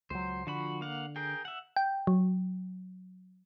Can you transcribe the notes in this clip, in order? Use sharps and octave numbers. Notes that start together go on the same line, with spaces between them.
C#2 F#3 C5
D3 F3 F#4 B5
A#3 F5 F#5
G#4 A#4 G5
E5 F#5
G5
F#3